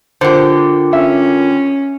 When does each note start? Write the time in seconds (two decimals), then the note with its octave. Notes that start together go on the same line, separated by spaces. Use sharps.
0.21 D3 F4 G4 A#4 C5
0.93 C#4 E5